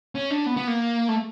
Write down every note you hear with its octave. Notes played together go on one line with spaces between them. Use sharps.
C#4
D4
B3
B3
A#3
A3